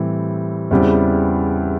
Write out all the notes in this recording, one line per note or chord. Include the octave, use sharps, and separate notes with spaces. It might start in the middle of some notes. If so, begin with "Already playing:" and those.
Already playing: A2 E3 G3 C4
E2 C#3 E3 G3 C4